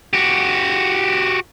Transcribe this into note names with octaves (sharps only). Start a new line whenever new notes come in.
F#4 G4